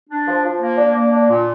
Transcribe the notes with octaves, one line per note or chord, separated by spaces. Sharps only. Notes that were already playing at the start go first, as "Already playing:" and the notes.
D4
F3
F3
A#3
D4
A#3
D4
A#2